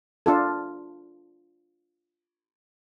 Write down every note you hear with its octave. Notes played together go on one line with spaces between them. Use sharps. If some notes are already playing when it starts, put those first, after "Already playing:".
D4 F4 A4